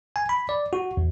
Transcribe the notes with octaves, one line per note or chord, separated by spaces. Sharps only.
G#5
B5
D5
F#4
E2